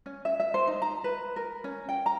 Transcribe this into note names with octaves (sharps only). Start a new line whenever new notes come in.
C#4
E5
E5
C5
D#4
A#5
B4
A#4
C#4
G5
A#5